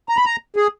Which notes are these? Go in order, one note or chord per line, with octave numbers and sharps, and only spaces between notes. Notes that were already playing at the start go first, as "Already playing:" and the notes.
A#5
B5
A#5
G#4